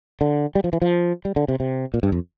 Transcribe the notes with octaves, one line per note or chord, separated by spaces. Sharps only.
D3
G3
F3
E3
F3
G3
D3
C3
C3
A#2
G2
F2